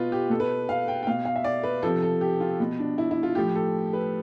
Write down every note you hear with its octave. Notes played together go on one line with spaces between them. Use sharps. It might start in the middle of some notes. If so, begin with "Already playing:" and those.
Already playing: B2 F4 B4
G4
B2 A4
B4
F5
G5
G5
B2 F5
F5
E5
D5
B4
C3 F3 A4
A4
G4
F4
B2
D4
E4
E4
F4
A2 F3 G4
A4
B4